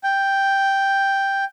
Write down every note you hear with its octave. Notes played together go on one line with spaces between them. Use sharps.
G5